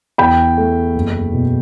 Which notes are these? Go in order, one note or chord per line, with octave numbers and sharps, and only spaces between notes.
E2 G5 B5
A3
F#1
B2